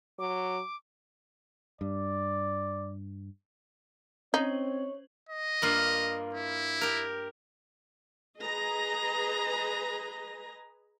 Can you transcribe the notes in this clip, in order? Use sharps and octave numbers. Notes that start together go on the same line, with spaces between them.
F#3 D6
G2 D5
C4 C#4 D#4 C5 C#5 F#7
D#5
G2 A#3 F4
E4
G4 A#4
G#4 B4 D#5 G#5 A#5